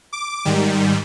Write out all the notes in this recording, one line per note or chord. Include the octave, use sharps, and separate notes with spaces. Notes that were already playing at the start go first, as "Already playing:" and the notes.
D6
G#2 D#3 G3